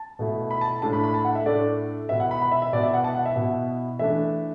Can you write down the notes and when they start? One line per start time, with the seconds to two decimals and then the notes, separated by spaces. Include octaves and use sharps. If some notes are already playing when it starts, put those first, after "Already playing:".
Already playing: A5
0.19 B2 A3 E4
0.51 B5
0.61 A5
0.82 A2 A3 D4 A5
0.93 B5
1.04 B5
1.14 A5
1.25 F#5
1.35 E5
1.46 A2 A3 D4 D5
2.09 B2 B3 E4 E5
2.20 F#5
2.31 B5
2.42 B5
2.52 E5
2.62 E5
2.73 B2 B3 E4 D5
2.83 E5
2.94 F#5
3.04 A5
3.15 F#5
3.26 E5
3.36 B2 B3 E4
3.99 E3 A3 D4 E5